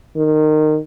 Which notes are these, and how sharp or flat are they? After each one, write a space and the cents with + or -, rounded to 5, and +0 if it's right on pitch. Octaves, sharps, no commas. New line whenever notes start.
D#3 -20